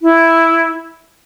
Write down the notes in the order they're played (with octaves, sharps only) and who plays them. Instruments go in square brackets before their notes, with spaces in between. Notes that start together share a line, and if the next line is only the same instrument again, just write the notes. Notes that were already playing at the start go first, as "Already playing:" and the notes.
[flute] E4